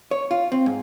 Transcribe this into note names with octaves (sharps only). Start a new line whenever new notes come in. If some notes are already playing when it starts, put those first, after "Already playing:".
C#5
F4
C4
G#2